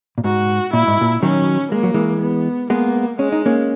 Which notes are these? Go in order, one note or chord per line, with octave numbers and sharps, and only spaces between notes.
A#2
G#2 F#4
A#2 E4
G#2
A#2
D#3 F#3 C#4
G#3 A#3
F#3
E3 G#3
B3
G#3 A#3 B3
G#3 C#4
D#4
A#3 C#4